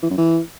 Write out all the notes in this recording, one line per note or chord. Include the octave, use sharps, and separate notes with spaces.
E3
F#2
E3